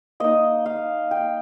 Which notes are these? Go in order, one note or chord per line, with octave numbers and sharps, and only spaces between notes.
A#3 D#4 D#5
F5
G5